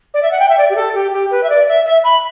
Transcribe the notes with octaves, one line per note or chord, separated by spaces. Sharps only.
D5
E5
F#5
G5
E5
D5
G4
A4
G4
G4
B4
E5
D5
E5
E5
B5